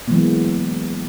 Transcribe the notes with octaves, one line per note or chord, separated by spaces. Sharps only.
E3 F#3 G#3 A#3 B3